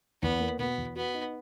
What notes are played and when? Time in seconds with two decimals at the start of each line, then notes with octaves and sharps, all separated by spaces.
0.22 E2 B3
0.40 A#3
0.59 B2 B3
0.78 E2
0.96 B3 F#4
1.14 D#4